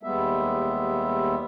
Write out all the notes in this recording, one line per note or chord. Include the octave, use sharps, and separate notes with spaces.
D#2 G3 G#3 B3 E5